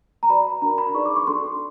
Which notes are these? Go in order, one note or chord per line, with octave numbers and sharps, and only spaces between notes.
A#5
F#4 B4 D5 B5
D4 F#4 A#4 A#5
B5
D#4 G#4 B4 D5 C#6
D6
C#6
D4 F#4 A4 C6